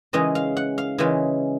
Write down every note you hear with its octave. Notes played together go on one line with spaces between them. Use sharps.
C#3 E3 G#3 C#4 D#5
F5
F#5
F5
C#3 E3 G#3 C#4